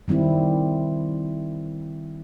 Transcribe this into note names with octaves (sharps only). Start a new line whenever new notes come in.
D#3 G3 C4 E4